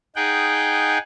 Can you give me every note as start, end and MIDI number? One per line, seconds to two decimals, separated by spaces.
0.16 0.98 63
0.16 0.98 68
0.16 0.98 78
0.16 0.98 79